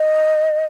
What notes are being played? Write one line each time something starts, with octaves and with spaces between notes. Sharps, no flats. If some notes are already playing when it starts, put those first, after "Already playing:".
Already playing: D#5